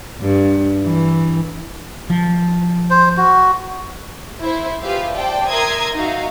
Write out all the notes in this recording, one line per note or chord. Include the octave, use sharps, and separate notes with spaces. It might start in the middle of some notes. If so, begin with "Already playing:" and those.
G2
E3
F3
C5
F#4
E4 C5
F4 G4 G#4 B4 E5 F5
C5 D5 G5 A5
A#4 E5 A#5 C6 D#6 G#6
D#4 F#4 E5 F5